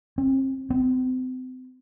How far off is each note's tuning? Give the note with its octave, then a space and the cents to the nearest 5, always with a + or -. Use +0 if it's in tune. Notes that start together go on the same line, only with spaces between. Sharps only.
C4 +35
C4 -35